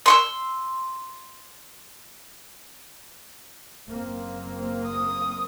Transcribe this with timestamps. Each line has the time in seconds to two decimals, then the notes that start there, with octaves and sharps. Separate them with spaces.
0.06 C6 C#6 E6
3.88 F#1 A#3 C4
4.87 D#6